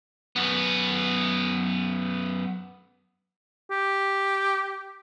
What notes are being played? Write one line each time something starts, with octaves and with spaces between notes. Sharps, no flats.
F#2 B3
G4